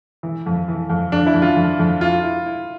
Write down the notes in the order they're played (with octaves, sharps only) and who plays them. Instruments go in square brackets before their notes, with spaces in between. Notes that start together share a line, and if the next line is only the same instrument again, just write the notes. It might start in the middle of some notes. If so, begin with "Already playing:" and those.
[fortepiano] E3
F2
E3
F2
[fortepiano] F2 [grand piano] D4
[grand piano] E4
[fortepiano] F2
[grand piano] F4
[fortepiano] F2
F2
[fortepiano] E4 [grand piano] F4
[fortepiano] E4
E4